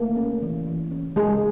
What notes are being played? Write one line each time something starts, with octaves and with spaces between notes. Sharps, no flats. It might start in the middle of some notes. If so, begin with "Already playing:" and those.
Already playing: A3 A#3
C#4
E3
E3
C#4
G#3 G#4